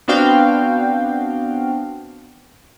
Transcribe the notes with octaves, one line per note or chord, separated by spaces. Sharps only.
B3 C4 D4 F#4 F5 G5